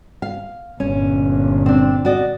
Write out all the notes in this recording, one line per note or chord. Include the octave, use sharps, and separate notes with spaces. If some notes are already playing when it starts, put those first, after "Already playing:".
F5
G1 A#2 C#4
C4 D4
F#4 D5 D#5